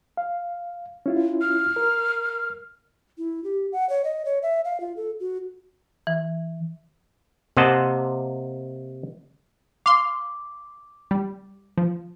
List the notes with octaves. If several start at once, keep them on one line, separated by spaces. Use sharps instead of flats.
F5
C#4 E4 F4
F6
A#4
E4
G4
F#5
C#5
D#5
C#5
E5
F5
F4
A4
F#4
E3
C3 A#3 C5 D#5 F#5 A5
F5 C6 D6
G3
F3